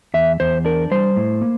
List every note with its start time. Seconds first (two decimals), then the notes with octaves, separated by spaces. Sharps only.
0.14 E2 E5
0.40 E2 C5
0.65 D4 A#4
0.91 G3 C5
1.16 A2
1.42 A#3